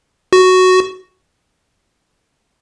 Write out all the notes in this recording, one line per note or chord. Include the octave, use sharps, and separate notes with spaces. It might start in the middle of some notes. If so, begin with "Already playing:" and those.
F#4